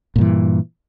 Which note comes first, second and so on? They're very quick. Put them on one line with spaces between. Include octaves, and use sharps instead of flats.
A#2 G2 E3